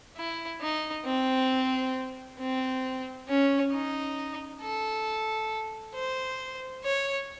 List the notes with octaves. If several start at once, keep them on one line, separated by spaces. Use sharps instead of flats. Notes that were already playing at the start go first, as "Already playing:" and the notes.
E4
D#4
C4
C4
C#4
D#4
A4
C5
C#5